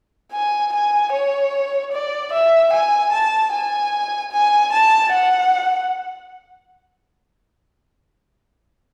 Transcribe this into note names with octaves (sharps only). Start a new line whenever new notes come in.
G#5
G#5
C#5
D5
E5
G#5
A5
G#5
G#5
A5
F#5